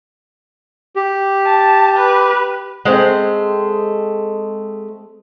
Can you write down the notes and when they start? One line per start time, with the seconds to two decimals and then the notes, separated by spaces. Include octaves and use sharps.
0.96 G4
1.46 A5
1.96 B4
2.85 G#3 A3 C4